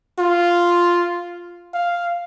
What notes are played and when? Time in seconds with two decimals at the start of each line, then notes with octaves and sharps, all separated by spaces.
0.19 F4
1.74 F5